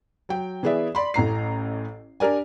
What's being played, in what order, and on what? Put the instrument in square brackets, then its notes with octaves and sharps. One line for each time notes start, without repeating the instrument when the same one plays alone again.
[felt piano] F#3 G5
E3 B3 G#4 D5 E5
D5 B5 C6
A1 A2 A#5 C7
D4 G4 A#4 D5 G#5